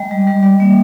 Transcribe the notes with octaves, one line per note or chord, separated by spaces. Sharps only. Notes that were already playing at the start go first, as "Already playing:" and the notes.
Already playing: G#3 D#5 G5
G3
G3
G3
A#3